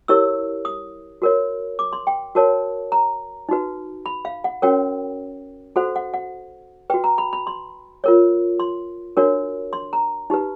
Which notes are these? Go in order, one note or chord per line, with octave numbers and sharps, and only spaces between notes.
E4 G4 A#4 C#5 E6
D#6
F#4 A#4 C#5
D6
C6
G5
F#4 A#4 C#5 A5
A#5
D#4 F#4 B4
B5
F5
F#5
C#4 F#4 A#4 C#5 G5
F#4 A4 C5 F#5
F#5
F#5
F#4 B4 G5
A#5
B5
B5
C6
F4 A#4 C#5
C6
D4 F#4 A#4 C#5
C6
A#5
D#4 G4 B4